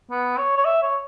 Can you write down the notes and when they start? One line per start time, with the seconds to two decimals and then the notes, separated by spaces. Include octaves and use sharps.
0.11 B3
0.37 C#5
0.57 C#5
0.65 E5
0.83 C#5